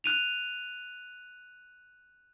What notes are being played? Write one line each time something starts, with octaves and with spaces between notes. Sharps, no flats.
F#6 D#7 F7